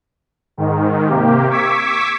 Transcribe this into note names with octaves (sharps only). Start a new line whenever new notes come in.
G#2 D#3
C3 A#3 G4
C#6 D6 E6 G#6 B6